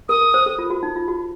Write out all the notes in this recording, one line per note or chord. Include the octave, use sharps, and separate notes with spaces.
A#4 D#6
A#4
C5
A4
F4
F#4
D#4
F4
F#4